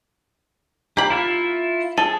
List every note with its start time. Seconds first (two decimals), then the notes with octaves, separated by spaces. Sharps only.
0.97 A#3 G4 B5
1.10 E4 F4 E5
1.98 G#4 A4